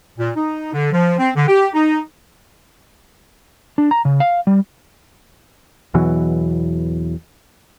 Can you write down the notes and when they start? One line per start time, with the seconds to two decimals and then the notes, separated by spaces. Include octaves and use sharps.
0.18 A#2
0.36 D#4
0.73 D3
0.92 F3
1.18 C4
1.36 D3
1.48 G4
1.74 D#4
3.78 D4
3.91 A#5
4.05 C#3
4.20 F5
4.47 G3
5.94 E2 B2 E3 F#3